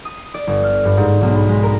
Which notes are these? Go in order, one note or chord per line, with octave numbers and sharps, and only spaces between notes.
D#6
C7
D5
G1
F6
G2
G#2
B1
B5
G#3
A#4